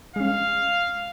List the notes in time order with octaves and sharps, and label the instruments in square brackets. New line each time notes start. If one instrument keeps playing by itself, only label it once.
[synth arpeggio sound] G#3 C#4 [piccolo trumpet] F5